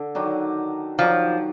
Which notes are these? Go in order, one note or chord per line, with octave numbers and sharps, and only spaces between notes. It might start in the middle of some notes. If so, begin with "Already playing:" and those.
Already playing: D3
D#3 F#3 D4
D#3 F3 F#3 D4